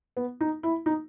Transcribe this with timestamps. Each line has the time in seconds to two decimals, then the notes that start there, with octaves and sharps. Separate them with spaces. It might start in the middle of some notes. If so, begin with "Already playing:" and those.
0.17 B3
0.41 D#4
0.63 E4
0.86 D#4